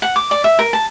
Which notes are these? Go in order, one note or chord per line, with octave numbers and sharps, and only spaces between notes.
F#5
D6
D5
E5
A#4
A5